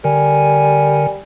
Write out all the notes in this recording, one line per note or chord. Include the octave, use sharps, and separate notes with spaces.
D3 G3 A#4 G#5